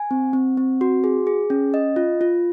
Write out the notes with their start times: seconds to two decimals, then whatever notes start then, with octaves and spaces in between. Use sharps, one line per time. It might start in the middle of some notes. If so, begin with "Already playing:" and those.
Already playing: G#5
0.11 C4
0.33 C4
0.57 C4
0.81 F#4
1.04 G#4
1.27 G#4
1.50 C#4
1.74 D#5
1.96 F4
2.21 F4